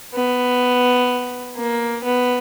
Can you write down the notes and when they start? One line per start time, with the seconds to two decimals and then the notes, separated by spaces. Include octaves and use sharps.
0.15 B3
1.57 A#3
2.04 B3